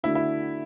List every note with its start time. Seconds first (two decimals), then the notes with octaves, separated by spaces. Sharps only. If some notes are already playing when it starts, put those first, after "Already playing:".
0.03 D3 A3 D4 E4 F#4
0.15 E4